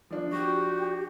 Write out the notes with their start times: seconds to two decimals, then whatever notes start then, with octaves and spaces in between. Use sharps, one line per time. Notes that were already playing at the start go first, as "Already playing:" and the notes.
0.10 F3 D4
0.32 F#4 G4